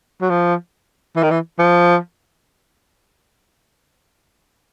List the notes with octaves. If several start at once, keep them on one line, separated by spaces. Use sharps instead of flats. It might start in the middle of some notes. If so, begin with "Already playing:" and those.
F#3
F3
E3
D#3
E3
F3